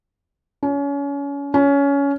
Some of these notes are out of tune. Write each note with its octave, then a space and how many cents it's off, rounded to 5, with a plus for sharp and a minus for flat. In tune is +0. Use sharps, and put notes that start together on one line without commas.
C#4 +30
C#4 +20